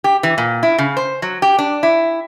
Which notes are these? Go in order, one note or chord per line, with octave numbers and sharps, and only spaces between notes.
G4
E3
A#2
E4
C#3
C5
F#3
G4
D4
E4